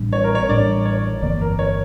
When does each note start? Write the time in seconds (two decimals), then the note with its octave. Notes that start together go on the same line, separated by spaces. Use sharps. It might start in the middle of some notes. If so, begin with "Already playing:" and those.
Already playing: A1 A2 G3 D4
0.12 C#5
0.24 A#4
0.35 C#5
0.49 A1 A2 G3 D4 D5
0.85 C#5
1.22 G1 F2 E3 A#3 D5
1.41 A#4
1.59 C#5